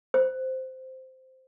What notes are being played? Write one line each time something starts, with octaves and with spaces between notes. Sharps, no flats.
C5